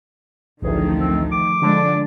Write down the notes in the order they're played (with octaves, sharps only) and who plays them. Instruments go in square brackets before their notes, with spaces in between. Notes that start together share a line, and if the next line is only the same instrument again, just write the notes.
[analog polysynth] A1 D2 [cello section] D#3 F3 A3 [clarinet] G#4
[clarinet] C4
D6
[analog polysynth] D3 [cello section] F3 G#3 D4